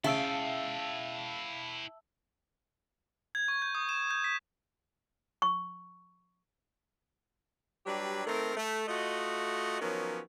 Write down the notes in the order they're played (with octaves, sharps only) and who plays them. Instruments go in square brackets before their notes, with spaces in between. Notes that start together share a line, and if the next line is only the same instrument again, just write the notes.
[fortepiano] C#3 [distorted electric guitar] E4 G5 [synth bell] E5 A5 E6 [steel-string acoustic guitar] F5
[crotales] G#6
C#6
G6
D#6
E7
G6
B6
[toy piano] C#6
[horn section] F#3 G3 D4 G4 B4
D#3 A3 C4 A4 A#4
A3
A3 F4 F#4 D#5
D#3 F3 F#3 B3 C#4